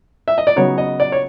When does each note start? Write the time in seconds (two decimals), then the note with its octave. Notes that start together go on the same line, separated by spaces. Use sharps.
0.28 E5
0.38 D#5
0.47 D5
0.56 C#3 F#3 B3 D#4 C#5
0.78 D#5
1.00 D5
1.12 C#5